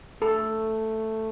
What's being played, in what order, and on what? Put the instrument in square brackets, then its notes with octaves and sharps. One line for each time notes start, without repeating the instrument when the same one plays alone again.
[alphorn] A3 [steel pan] A4